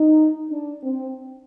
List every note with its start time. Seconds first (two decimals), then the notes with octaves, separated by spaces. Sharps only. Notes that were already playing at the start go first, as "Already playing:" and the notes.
Already playing: D#4
0.50 D4
0.83 C4